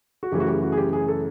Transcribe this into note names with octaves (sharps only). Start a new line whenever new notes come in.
F#4
F#2 C#3 E3 A3 G4
F#4
G4
F#4
G#4
G4
G#4
A4